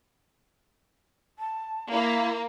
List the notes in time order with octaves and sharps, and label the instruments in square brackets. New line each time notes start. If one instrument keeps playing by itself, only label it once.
[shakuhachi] A5
[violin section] A#3 [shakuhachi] E4